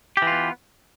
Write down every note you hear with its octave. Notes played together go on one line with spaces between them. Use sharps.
E3 B3 F4 G4